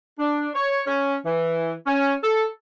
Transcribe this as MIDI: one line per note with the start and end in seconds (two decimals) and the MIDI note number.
0.19 0.48 62
0.54 0.81 73
0.87 1.15 61
1.25 1.72 52
1.87 2.13 61
2.22 2.45 69